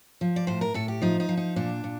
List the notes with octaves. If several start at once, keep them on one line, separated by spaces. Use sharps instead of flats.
F3
D5
A2 C5
A#4
A2 A4
G4
F3 D#4
D#4
F3
D#4
A#2 D4
A#2